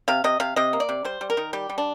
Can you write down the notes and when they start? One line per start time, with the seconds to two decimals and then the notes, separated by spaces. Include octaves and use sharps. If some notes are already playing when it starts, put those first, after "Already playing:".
0.08 C3 F5
0.24 C3 D#5
0.40 C3 F5
0.56 C3 D#5
0.73 A#3
0.80 D5
0.89 C3
1.05 G3 C5
1.21 G3
1.30 A#4
1.37 D#3
1.53 G3 G4
1.69 G3
1.78 D4